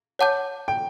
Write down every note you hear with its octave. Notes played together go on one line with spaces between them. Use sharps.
C#5 F#5 A5 D6 G6
G5